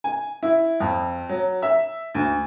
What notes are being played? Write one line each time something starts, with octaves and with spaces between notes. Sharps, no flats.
G#5
E4
F2
F#3
E5
D2